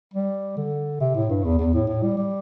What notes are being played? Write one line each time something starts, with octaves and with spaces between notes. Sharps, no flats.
G3
D3
C3
A2
G2
E2
E2
A2
A2
G3
G3